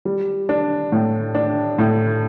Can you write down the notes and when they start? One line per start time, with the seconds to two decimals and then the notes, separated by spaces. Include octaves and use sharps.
0.05 G3
0.49 D4
0.92 A2
1.35 D4
1.78 A2